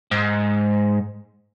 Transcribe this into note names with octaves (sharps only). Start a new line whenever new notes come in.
G#2